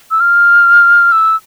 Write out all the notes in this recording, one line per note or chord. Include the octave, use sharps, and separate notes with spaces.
E6
F6
E6